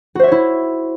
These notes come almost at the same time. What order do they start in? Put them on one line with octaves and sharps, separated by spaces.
F#4 C5 E5 C#5 E4